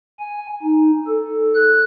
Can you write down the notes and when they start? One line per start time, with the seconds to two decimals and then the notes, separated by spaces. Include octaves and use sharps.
0.20 G#5
0.63 D#4
1.07 A4
1.55 F#6